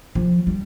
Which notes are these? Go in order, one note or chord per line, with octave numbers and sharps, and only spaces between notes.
F3
G3